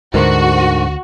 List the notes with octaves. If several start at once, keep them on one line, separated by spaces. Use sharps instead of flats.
D2 G#2 D3 F#4 G4 A#4 C5